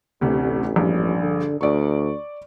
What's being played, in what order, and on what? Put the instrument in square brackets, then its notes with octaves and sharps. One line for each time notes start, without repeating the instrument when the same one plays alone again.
[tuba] A1 [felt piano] D2 C3
[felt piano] A#1 G2
[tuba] D3
[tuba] D2 [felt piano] D5 C#6